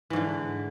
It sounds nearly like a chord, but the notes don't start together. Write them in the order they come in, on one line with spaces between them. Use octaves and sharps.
E3 G#2 D3